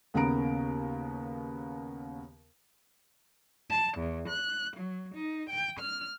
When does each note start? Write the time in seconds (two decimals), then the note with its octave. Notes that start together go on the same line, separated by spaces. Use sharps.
0.14 D#2 C#3 B3 A#4 A#5 D7
3.69 A5
3.98 E2
4.27 F#6
4.76 F#3
5.14 D#4
5.49 G5
5.80 F6